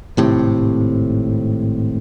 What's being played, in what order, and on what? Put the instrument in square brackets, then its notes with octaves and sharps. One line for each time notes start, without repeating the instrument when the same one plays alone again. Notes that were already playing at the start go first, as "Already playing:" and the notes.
[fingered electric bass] G#1 A2 C3